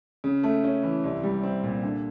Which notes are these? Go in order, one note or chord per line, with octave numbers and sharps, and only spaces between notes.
C#3
A3
C#4
E3
C2
G3
C4
A#2
D3